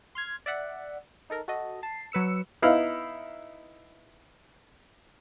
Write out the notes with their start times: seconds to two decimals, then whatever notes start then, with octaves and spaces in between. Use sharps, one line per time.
0.15 C6 F6 G#6
0.46 D5 E5 F#5
1.30 D#4 A4 A#4
1.48 F#4 A4 D#5
1.82 A5 C7
2.12 F#3 B4 E6 C#7
2.62 B3 D#4 E4 F5